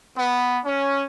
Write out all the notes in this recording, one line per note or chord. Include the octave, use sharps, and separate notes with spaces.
B3
C#4